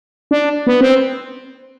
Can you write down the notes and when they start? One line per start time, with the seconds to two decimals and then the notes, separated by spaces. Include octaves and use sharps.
0.31 D4
0.67 B3
0.81 C4